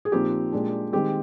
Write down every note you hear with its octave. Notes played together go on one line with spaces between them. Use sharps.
G#4
A#2 F3 C4 D#4 G4
A#2 G#3 D4
D#3 G#3 C4 G4